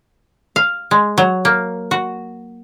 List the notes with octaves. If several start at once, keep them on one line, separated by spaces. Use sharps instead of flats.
F5
G#3
F#3
A#3
F#4